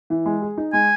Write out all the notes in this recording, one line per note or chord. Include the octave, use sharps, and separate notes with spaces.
E3
G#3
G#4
D#4
G#3 G#5